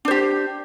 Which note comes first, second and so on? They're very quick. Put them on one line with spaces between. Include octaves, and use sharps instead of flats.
D4 C5 G4